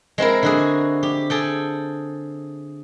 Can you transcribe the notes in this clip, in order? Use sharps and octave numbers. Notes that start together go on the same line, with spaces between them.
G#3 C4 E4 A#4
D3 F#4 G#4
G4
G#4 A4 G5